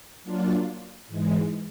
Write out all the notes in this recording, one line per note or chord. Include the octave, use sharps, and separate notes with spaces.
F#3 A#3 D4 F4
G#2 E3 G#3